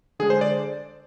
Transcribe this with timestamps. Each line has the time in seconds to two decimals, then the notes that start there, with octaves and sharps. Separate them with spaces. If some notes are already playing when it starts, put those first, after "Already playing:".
0.19 D3 G#4
0.23 G#3
0.30 C5
0.41 D5